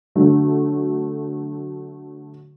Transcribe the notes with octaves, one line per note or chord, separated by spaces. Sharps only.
D3 F#3 A3